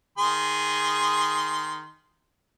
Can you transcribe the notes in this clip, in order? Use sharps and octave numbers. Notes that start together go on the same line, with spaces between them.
D#3 G#4 C6